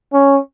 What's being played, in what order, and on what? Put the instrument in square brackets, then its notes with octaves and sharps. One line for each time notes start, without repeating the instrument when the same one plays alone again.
[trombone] C#4